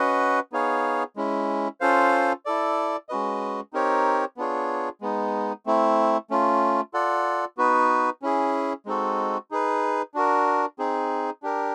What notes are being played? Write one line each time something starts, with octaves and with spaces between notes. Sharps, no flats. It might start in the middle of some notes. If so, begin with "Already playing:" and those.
Already playing: C#4 F#4 B4 D#5 F#5
B3 D#4 G#4 C#5 F5
G#3 C#4 E4
C#4 F4 A4 C5 F5
E4 A4 D5
G#3 C#4 F#4 B4 D#5
C4 D#4 G4 A#4 C#5
B3 D4 F4 G#4 C#5
G#3 B3 D#4
A3 C4 E4
A3 C#4 F4
F4 A4 D5 F#5
B3 D#4 F#4 B4
C#4 E4 G#4
G#3 C4 D#4 F#4 A4
D#4 G#4 B4
D4 F#4 A#4
C4 D#4 G#4
D4 G4 A#4